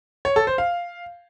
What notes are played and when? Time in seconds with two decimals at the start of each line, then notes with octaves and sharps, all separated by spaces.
0.25 C#5
0.36 A4
0.47 C5
0.58 F5